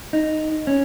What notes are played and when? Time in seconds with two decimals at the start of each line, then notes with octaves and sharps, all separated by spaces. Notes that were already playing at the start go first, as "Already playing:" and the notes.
0.13 D#4
0.67 C#4